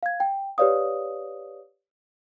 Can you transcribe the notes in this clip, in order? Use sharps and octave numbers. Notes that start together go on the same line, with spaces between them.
F5 G#6
G5
G4 B4 C#5 D5 F5 D#6